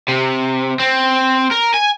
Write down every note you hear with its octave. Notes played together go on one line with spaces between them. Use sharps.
C3
C4
A#4
G#5